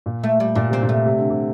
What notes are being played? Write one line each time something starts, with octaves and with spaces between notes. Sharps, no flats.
A#2
A3
G3
A#2 D4
C3 C4
A#2
A3
C3
D3
C3